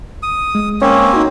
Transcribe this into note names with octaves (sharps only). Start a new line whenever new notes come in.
D#6
G#3
A#3 C4 C#4
D#4 F#4